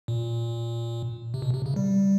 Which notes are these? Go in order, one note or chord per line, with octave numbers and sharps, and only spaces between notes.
A#2
C3
B2
C3
C#3
G3